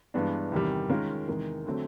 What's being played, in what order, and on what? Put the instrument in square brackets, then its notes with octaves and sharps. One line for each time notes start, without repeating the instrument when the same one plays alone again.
[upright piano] G2 E3 G#3 B3 D4
E2 C3 D#3 G3
D#3 G#3 C#4 F4 A#4
E2 C3 D#3 G#3
D3 F#3 A3 C4